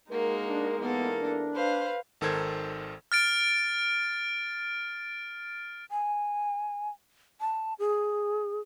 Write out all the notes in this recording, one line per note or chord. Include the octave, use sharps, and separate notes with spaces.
G#3 A#3 D#4 F#4 A#4
D4
E2 A#3 B3 A4 A#4
D4
B4 C5 F5
G#1 D#3 A4 A#4 C5 G#6
F6 A6 D7
G#5
A5
G#4